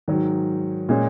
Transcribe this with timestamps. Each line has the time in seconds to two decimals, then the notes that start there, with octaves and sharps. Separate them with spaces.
0.08 G#2 D#3 F#3
0.89 A#2 G#3 C#4